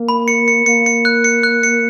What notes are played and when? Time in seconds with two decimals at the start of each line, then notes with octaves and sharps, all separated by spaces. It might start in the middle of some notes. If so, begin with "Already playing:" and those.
Already playing: A#3
0.09 B5
0.28 C#7
0.48 C#7
0.66 A#3 C#7
0.86 C#7
1.05 F#6
1.24 C#7
1.43 F#6
1.63 C#7